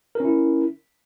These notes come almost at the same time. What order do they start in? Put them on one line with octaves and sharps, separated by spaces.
A#4 C#4 E4